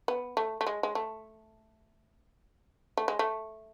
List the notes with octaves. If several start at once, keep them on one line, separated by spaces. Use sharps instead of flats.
B3
A3
A3
G#3
G#3
A3
A3
G#3
A3